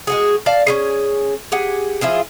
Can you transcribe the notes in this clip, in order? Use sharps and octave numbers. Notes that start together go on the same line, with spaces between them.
G#3 F#4 G#4
D5 F5 A5
C#4 F4 G#4
G4 G#4 F#5
F3 E4 F4 G#4